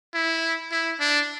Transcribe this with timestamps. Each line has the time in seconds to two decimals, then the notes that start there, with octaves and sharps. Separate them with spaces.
0.14 E4
0.72 E4
1.00 D4